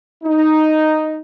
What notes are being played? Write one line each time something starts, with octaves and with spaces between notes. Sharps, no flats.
D#4